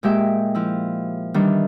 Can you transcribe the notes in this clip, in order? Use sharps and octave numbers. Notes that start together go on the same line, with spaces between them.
A#2 G#3 G4 E5 G5
F3 E4
D#3 E3 G3 D4